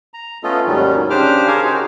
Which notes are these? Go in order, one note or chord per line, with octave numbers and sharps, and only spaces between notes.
A#5
A3 B3 C#4 F4 A4 D#5
D#2 G#2 D#3 F#3 G3 C#4
C#3 D4 G4 C5 D6 F6
G#4 A#4 C5 C#5 F5 G#5
D#4 F#4